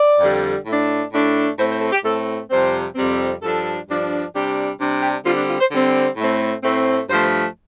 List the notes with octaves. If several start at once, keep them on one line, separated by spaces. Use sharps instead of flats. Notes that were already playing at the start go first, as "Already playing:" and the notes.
Already playing: D5
F2 D3 G3
A2 A3 D4
A2 A3 D4
A2 A3 C4 C5
C5
A4
G4
A2 A3 C4 A4
F2 C3 G3 C4 C5
F2 C3 G3 C4
G2 F3 D4 A4
G2 F3 D4
C3 G3 D4 G4
C3 G3 D4
G4
D3 G3 C4 F4
D4
F4
C5
D3 G3 C4
A2 A3 C4
A2 A3 C4
G2 F3 A3 C5